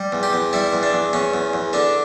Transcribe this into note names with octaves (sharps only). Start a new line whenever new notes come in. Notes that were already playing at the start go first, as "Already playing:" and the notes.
Already playing: G3
E2
G4
E2
G3 E4
E2
D4
E2
E2 C#4
E2
E2
D3 D4